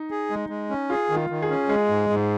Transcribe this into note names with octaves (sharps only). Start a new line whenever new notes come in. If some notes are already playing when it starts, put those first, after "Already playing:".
Already playing: D#4
G#4
G#3
G#3
C#4
F4 G#4
D#3
F4
D#3
G#4
C#4
G#3 G#4
G#2
G#2